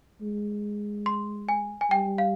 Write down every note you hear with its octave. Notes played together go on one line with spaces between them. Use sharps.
G#3
C6
G#5
G#5
G3 G5
F5